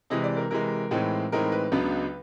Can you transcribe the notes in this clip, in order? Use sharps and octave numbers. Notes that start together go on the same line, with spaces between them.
C3 E3 G#3 D#5
D5
A#4
C3 E3 G#3 A#4
A2 E3 G#3 C4 D#4
A2 E3 G#3 C4 D#4 A#4
B4
C#2 C#3 F#3 B3 D4 B4